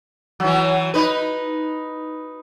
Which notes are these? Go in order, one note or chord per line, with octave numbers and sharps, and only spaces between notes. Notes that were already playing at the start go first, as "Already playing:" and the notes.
E3 F#3
D#4 B4